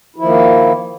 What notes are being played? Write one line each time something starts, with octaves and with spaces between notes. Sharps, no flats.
D#3 F3 A#3 E4